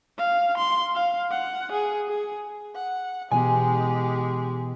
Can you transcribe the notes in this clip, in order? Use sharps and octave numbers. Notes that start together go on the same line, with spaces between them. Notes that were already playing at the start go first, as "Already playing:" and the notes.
F5
C6
F5
F#5
G#4
G#4
F#5
B2 E3 G#3 B3 G4 G#5